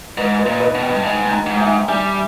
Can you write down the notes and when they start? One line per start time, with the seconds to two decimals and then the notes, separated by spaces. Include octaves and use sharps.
0.17 G#2 B4 D#5
0.39 B4 D#5
0.46 A#2
0.60 B4 D#5
0.75 B2
0.82 D#5 G5
0.93 G2
1.03 G#2 D#5 G5
1.32 G5 A#5
1.46 G#2
1.55 G5
1.61 E5 G#5
1.88 G3 E5 G#5